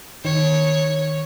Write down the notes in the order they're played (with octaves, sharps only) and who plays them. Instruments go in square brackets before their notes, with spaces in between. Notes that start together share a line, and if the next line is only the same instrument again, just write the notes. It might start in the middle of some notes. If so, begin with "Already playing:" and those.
[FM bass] D#3 [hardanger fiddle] C#5